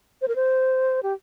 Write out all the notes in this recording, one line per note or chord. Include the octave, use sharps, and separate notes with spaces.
C5
A#4
C5
G4